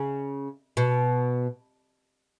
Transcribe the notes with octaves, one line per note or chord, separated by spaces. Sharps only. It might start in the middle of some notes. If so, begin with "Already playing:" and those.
Already playing: C#3
B2